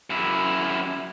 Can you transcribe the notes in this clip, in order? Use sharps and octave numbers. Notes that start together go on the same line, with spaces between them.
F#2 E4